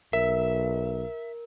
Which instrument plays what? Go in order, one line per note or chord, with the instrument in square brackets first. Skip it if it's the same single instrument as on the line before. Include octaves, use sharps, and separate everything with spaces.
[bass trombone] B1 [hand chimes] A#4 [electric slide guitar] E5